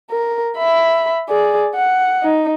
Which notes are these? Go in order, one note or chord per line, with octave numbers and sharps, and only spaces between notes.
A#4
E5 B5
G#4 D5
F#5
D#4